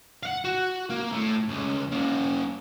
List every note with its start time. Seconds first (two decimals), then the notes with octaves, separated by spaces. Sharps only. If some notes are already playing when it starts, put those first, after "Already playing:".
0.23 F5 F#5
0.44 F#4
0.90 A#3
1.12 A2
1.48 C#2
1.92 A#3 C#4